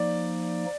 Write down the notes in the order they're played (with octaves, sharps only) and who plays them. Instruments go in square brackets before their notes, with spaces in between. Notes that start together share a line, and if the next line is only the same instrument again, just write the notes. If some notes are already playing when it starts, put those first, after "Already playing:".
Already playing: [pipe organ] F3 A#3 D#4 [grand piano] D5